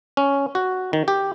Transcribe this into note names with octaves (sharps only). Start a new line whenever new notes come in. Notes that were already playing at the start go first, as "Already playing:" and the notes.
C#4
F#4
D#3
G4